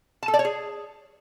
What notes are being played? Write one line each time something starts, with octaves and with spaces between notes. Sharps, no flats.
A5
A4
D5
C#5
G#4